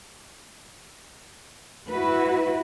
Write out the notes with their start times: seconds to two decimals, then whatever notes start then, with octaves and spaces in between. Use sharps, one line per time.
1.88 E4 F#4 B4